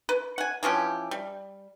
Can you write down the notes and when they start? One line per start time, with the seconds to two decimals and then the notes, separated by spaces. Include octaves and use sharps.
0.09 B4
0.38 F#5 G#5
0.63 E3 F3 C#4 G4
1.11 G3